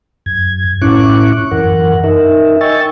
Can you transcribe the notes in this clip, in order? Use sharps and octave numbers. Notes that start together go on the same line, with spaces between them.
F#2 G#6
A2 C#4 E4 C#6 D6 F#6
F#2 E3 A#4 F#5
D#4 A#4 E5
D#5 G5 G#5 C#6 E6 A6